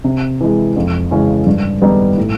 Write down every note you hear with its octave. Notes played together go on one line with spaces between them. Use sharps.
C3
E3 G#3
F2
C#3 E3 G#3 C#4
G2
D#3 G3 B3 D#4
A2